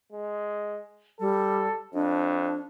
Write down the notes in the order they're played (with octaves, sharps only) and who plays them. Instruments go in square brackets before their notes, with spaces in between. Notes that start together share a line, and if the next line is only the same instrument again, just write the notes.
[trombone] G#3
[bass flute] G3 [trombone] A4
[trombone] F2 [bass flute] D4